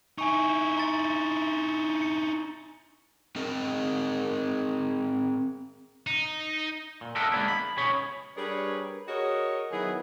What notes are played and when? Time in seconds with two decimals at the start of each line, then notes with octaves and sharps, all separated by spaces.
0.18 D#4 E4 G#5 C#6
0.77 A#5 C6 A6
2.02 C#7
3.36 C4 G#4 A#4 D#5
6.07 D#4
7.01 A#2
7.15 A4 A#4 D#5 E5 F#5
7.32 G#3 A#3 B3 C#4 D4 E4
7.48 B5
7.77 C#2 C#4 G#4 C#5 B5
8.36 G3 D4 G#4 A#4 B4 C#5
9.07 F#4 G#4 A#4 C#5 D#5
9.71 D#3 F#3 B3 E4 G#4